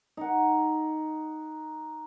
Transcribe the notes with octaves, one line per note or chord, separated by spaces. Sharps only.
D#4 F#5